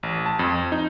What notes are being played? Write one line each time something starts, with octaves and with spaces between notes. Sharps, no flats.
A1
A5
F2
D#4